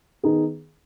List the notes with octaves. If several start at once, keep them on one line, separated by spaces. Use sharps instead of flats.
D#3 B3 D#4 G#4